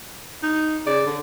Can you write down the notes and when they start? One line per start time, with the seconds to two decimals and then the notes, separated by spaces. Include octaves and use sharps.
0.43 D#4
0.87 C#3 D5
1.07 D3